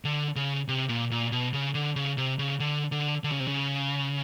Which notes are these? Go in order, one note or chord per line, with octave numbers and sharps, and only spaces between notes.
D3
C#3
C3
A#2
A#2
B2
C#3
D3
C#3
C3
C#3
D3
D3
D3
C#3
C3
C#3